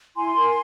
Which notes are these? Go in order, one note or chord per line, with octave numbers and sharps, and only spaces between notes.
E4 G#5 C6
A#4